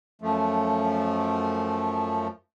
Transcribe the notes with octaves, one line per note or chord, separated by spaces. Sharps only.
F#2 F3 A3